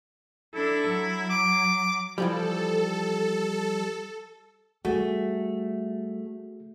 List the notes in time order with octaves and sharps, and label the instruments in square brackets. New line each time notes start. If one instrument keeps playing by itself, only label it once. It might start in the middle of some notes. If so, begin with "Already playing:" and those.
[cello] D4 A4 [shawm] E4
[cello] F#3
[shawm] D6
[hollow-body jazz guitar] E3 F3 G3 [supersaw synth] A4
[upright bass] G3 [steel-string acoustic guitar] A3 [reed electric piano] F#4 G#4